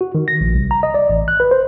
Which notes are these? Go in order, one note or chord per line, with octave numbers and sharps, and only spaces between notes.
F#4
D#3
A#6
A#1
C2
A#5
D#5
D5
A1
F#6
B4
C5